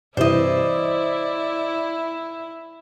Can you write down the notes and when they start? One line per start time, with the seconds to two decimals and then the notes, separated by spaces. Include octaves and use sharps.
0.17 G2 C3 E3 E4 C5 D5 D#5